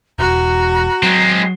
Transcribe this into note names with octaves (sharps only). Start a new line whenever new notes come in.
E1 F#4 A#5
F#3 G#3 C4